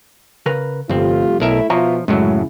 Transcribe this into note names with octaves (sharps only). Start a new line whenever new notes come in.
C#3 A#4 B4
G1 C2 F2 A3 C4 F4 G4
B1 A3 E4 A#4 E5
B2 F3 F4 C#5 E5 A#5
F#2 A2 C#3 F#3 G#3 E4